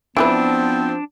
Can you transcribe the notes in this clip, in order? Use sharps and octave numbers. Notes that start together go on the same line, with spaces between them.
E3 F3 B3 C4 D4 G#4 B4